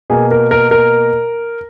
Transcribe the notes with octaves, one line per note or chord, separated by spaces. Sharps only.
B2 A#3 G#4
A#4
A#4
A#4